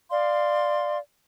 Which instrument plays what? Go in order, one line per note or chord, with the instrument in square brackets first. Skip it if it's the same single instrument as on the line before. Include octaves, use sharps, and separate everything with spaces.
[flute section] D5 F5 C6